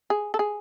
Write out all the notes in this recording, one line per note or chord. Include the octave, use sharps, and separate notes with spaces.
G#4
A4
G#4